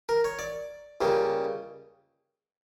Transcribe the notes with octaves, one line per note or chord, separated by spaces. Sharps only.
A#4
C#5
D5
C#2 C#3 G3 A#3